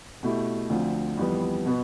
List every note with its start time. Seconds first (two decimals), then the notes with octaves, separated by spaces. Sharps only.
0.23 B2 A3 E4 G4
0.70 D2 D3 F3 C4
1.17 F2 E3 G3 B3
1.66 B2 B3